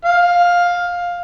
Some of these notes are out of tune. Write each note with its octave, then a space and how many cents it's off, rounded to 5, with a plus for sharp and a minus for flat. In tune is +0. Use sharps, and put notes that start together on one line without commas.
F5 +10